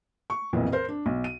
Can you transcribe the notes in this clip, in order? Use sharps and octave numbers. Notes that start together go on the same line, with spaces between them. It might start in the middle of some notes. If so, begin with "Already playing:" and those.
C#6
B1 F2 A#2 E3
A#4 C5
D4
B1
D#7